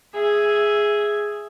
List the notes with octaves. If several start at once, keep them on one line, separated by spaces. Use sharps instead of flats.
G#4 E5